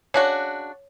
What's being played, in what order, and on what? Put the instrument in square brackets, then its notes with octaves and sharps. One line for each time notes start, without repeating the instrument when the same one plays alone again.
[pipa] C#3 D4 F#4 [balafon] C#5